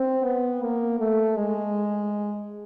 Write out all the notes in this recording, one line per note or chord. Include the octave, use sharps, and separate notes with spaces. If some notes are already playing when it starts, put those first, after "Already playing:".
Already playing: C4
B3
A#3
A3
G#3